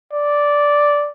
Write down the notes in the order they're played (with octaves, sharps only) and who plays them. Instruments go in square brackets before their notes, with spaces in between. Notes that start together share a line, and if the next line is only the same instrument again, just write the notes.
[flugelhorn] D5